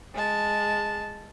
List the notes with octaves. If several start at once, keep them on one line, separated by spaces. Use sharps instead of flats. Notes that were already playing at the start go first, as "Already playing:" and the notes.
G#3 A5